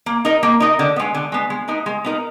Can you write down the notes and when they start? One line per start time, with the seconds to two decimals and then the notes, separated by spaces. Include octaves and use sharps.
0.06 A#3
0.25 D#4 A#4 D#5
0.43 A#3
0.60 D#4 A#4 D#5
0.79 D3
0.96 G#3 B3
1.14 D3
1.32 G#3 B3
1.50 G#3
1.68 B3 D#4 A#4
1.86 G#3
2.04 B3 D#4 A#4